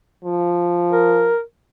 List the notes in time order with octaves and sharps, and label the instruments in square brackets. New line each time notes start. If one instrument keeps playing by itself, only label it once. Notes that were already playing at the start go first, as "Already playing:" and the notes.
[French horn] F3
[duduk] A#4